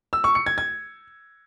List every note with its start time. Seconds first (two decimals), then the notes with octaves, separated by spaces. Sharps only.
0.13 E6
0.24 C#6
0.35 C#7
0.46 G#6
0.58 G#6